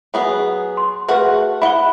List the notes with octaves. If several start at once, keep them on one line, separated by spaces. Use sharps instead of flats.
F#3 B3 G#4
C6
A3 F#4 G#4 B4 F#5
E4 F#5 B5 G7